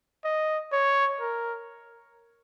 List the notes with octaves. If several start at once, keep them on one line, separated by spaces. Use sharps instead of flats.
D#5
C#5
A#4